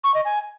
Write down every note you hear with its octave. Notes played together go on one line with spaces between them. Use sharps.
C#6
D#5
G#5